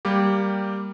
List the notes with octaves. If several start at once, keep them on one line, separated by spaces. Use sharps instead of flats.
G3 A#3 G4